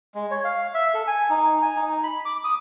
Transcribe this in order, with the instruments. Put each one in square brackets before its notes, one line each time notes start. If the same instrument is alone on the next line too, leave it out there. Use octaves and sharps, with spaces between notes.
[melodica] G#3
C#5
F5
E5
A4
G#5
D#4
G#5
D#4
B5
D6
D#6